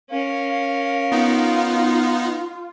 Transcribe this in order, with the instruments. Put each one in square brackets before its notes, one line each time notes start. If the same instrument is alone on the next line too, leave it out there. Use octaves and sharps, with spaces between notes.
[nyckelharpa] C#4 A#4 [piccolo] F5
[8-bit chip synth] B3 D#4 [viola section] F4